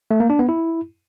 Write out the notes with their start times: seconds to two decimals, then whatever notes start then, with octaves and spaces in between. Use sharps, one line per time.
0.11 A3
0.20 A#3
0.30 D4
0.39 B3
0.49 E4